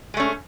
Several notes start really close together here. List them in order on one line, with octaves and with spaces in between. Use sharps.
G#3 A3 C#4